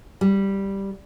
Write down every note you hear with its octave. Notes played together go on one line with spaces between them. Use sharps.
G3